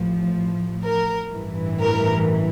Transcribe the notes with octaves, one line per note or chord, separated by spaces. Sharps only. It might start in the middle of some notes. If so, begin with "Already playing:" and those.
Already playing: A1 A2 F3
A#4
A1 G2 E3
A#4